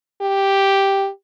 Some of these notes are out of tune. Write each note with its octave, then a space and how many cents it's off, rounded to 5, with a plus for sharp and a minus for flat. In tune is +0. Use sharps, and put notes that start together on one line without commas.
G4 +0